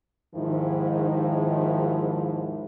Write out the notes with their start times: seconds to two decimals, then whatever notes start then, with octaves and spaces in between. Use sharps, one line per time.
0.35 D#2 G#2 D#3 F3 E4